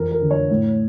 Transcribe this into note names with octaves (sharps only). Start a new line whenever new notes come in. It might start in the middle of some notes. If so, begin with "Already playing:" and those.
Already playing: F2 E3 A#4
A#4
D3
C#5
A2